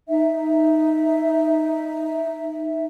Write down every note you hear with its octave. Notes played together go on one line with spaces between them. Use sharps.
D#4 E5